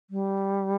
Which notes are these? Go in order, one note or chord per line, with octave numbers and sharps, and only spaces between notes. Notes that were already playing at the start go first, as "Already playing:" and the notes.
G3